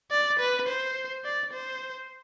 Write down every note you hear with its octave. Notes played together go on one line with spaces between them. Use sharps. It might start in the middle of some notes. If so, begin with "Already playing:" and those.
D5
B4
C5
D5
C5